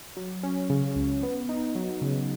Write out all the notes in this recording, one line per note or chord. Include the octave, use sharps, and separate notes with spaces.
F#3
C#4
C#3
C#2
B3
D#4
F#3
C#3